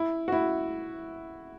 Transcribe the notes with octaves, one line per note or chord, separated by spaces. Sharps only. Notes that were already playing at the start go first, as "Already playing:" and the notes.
Already playing: E4
F#4
E4